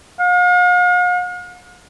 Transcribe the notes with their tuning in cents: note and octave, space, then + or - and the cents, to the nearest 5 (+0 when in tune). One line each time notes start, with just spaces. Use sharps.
F5 +45